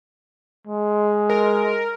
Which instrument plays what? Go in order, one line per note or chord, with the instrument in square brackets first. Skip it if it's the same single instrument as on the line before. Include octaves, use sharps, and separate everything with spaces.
[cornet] G#3
[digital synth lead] A#4